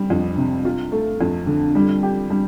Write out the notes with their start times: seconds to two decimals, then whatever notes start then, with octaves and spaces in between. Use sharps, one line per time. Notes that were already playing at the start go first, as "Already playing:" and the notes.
Already playing: G3 C4
0.10 F2
0.37 C3
0.65 F4
0.92 A3
1.21 F2
1.47 D3
1.75 G3
2.03 G4
2.30 G3